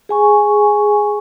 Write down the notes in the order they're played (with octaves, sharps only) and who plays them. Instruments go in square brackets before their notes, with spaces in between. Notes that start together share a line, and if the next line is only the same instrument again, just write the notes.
[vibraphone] G#4 G#5 C#6